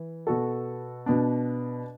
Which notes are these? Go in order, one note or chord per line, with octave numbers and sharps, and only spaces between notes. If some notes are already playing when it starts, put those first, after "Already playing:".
Already playing: E3
B2 B3 F#4 A4
B2 B3 D4